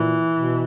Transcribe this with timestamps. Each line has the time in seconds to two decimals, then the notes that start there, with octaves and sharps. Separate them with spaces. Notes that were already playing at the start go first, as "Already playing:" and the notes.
Already playing: A#2 E3
0.34 B2